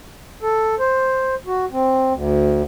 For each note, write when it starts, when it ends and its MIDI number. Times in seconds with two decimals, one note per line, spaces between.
0.43 0.75 69
0.79 1.35 72
1.47 1.65 66
1.72 2.13 60
2.13 2.62 38